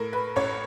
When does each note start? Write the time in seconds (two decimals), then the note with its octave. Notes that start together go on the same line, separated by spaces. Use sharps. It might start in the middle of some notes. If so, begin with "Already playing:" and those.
Already playing: A2 A#4
0.13 B4
0.36 A1 C#5